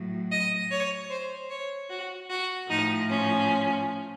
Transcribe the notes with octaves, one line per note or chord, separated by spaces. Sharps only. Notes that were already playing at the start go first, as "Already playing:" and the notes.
Already playing: A2 F#3
D#5
C#5
C5
C#5
F#4
F#4
A2 F3 D#4
C#4